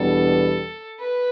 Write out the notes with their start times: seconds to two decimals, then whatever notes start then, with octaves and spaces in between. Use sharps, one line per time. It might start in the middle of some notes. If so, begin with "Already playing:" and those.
Already playing: E2 B2 G3 B3 D4 A4
1.00 B4